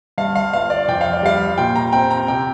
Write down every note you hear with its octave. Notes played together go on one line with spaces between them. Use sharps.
G2 F5
F5
G1 F5
D5
F2 G5
F5
D5
G3 F5
A#2 G5
A#5
C4 G5
A#5
C3 G5